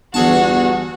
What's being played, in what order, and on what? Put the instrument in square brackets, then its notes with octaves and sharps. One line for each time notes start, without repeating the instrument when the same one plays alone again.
[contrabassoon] G1 [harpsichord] E2 G#4 A5 [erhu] F#4